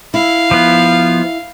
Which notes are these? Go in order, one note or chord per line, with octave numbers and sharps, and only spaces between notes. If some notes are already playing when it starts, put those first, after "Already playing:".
E4 F5
F3 B3